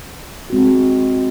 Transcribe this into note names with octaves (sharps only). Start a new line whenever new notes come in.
G#3 C4 F#4
F#4